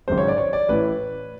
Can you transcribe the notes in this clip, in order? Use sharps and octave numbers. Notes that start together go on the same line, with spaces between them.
G#1 F#2 C#3 C5
C#5
D5
C#5
D5
A1 A2 E3 B4